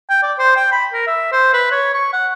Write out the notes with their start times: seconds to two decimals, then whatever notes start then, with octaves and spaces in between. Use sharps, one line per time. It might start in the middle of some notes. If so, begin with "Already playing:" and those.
0.09 G5
0.23 D5
0.38 C5
0.56 G5
0.72 B5
0.93 A#4
1.07 E5
1.32 C5
1.53 B4
1.71 C#5
1.94 C#6
2.13 F#5